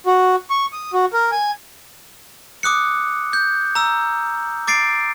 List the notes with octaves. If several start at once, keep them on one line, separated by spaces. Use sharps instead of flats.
F#4
C#6
D#6
F#4
A#4
G#5
D6 D#6 F#6 C#7
G6
A#5 E6
D6 A6 C7 D7